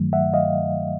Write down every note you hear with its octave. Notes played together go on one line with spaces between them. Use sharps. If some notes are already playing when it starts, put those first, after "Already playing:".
Already playing: G2 D#3 F#3 A3
E5 F#5
D#5 F5